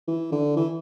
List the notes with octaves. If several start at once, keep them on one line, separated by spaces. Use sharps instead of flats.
E3
D3
E3